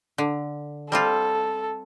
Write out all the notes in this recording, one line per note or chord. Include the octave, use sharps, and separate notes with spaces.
D3
G3 C4 F4 A4